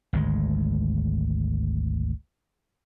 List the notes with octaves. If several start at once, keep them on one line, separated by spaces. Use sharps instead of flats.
G#1 D2 G#3